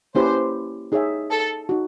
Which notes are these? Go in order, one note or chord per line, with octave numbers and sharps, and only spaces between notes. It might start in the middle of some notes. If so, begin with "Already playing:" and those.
A#3 C#4 E4 G4 B4 C5
D#4 G#4 C#5 E5 G5
A4
D#4 F#4